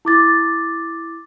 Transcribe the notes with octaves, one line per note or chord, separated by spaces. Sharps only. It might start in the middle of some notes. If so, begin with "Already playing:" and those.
E4 D6 A6